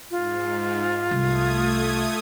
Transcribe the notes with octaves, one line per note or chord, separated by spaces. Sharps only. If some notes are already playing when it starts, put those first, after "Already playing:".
G#2 F4
C2 A3 D#6 G#6